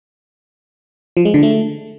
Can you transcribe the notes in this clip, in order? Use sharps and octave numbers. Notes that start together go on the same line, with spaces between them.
F3
G#3
D3
A3